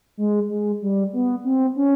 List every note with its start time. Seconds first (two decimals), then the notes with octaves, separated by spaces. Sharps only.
0.17 G#3
0.50 G#3
0.82 G3
1.13 B3
1.44 C4
1.76 C#4